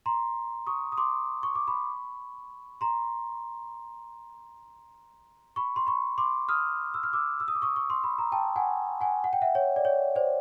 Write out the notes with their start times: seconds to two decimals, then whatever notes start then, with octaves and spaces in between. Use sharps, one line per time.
0.06 A#5 C6
0.66 C#6 D#6
0.92 D#6
0.98 C6 D6
1.43 C#6
1.55 D6
1.67 B5 C#6
2.81 A#5 C6
5.56 B5 C#6
5.76 C6
5.87 B5 C#6
6.18 C6 D6
6.49 D#6 F6
6.94 E6
7.03 F6
7.13 D6 E6
7.40 E6
7.48 D#6
7.55 D6
7.62 C#6 D#6
7.76 C#6
7.90 C6
8.04 B5
8.18 A#5
8.32 G5 A5
8.56 F#5 G#5
9.01 F#5 G#5
9.24 F#5
9.33 G5
9.42 E5 F#5
9.55 C#5
9.76 D5
9.85 C#5
10.16 C5 D5